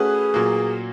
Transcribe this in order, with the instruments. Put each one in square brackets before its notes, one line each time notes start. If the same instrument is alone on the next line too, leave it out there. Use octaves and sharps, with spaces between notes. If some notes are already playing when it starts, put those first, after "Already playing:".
Already playing: [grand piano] A3 C#4 F#4 B4 [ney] G#4
[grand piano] A#2 F#3 A#3